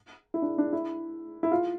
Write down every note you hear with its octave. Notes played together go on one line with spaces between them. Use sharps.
E4
D4
D4
E4
E4
F4